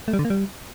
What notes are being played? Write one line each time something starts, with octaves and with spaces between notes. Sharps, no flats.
A3
G3
D3
A#3
G3